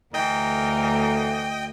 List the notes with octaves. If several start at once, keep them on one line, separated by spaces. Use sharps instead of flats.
D2 E3 A#4 D#5 G5